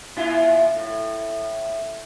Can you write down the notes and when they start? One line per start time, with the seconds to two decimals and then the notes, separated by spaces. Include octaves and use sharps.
0.17 A#2 E4 F4
0.75 A2